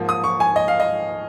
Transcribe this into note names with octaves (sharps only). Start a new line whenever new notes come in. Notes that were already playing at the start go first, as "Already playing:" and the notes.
Already playing: G#2 F3 A#3
D#6
C#6
G#5
D#5
F5
D#5